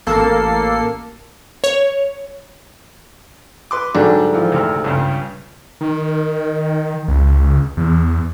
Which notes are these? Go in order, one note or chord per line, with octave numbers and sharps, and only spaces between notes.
A1 A#3 A4 C7
C#5
B4 C6 D6
G#2 D3 F#3 G3 D4
E3 F3 C4
D2 C3 F6
C#2 G2 C#3
D#3
C#2
E2